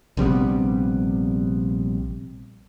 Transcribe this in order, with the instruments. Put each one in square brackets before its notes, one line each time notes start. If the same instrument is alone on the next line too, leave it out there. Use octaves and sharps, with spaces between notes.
[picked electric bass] A#1 C3 G3 B3